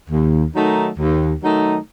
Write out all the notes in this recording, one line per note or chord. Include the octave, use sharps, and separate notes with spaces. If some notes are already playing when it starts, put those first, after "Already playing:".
D#2
D#3 F#3 A3 D#4
D#2
D#3 F#3 A3 D#4